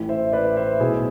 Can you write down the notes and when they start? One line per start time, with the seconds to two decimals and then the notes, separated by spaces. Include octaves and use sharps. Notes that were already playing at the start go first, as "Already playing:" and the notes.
Already playing: A1 A2 E3
0.09 C5 E5
0.32 B4 D5
0.56 C5 E5
0.80 B1 B2 E4 G#4